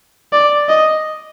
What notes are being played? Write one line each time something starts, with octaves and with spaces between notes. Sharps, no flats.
D5
D#5